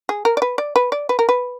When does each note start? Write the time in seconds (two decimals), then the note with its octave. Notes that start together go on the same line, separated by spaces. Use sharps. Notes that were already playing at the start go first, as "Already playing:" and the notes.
0.09 G#4
0.25 A#4
0.37 D5
0.42 B4
0.58 D5
0.76 B4
0.92 D5
1.09 B4
1.19 A#4
1.29 B4